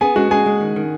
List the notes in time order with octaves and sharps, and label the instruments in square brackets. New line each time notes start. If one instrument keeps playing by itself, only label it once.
[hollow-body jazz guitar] B3 [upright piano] G#4 G#5
[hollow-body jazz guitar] G#3 [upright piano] F#4 F#5
[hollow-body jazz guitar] G#3 [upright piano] G#4 G#5
[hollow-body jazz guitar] G#3
D#3
D#3